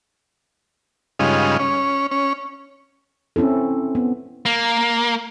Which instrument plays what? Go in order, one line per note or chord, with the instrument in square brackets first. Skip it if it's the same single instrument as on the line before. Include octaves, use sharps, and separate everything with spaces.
[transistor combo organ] G2 C#3 G#3 D#4 F4
C#4
C#4
[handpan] C4 C#4 E4 A4
B3
[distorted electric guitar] A#3